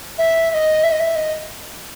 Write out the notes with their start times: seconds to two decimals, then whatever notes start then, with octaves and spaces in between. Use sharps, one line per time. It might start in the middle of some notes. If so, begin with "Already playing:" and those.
0.18 E5
0.51 E5
0.54 D#5
0.83 E5
0.92 D#5
0.99 E5
1.15 D#5